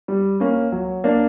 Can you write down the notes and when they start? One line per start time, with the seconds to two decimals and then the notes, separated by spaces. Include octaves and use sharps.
0.08 G3
0.40 A#3 C#4
0.72 F#3
1.04 A#3 D4